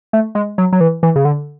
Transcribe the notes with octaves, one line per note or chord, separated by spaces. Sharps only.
A3
G#3
F#3
F#3
E3
E3
C#3
D3